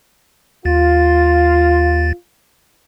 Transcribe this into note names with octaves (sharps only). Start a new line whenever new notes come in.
D#2 F4 A6